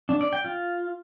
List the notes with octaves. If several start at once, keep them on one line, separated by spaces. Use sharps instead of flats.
D4
D5
G5
F4